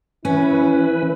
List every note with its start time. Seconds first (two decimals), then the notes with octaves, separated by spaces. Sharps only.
0.25 E3 C#4 E4 B4